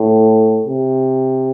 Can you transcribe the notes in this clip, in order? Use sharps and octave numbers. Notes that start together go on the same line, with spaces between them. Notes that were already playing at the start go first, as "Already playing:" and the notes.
Already playing: A2
C3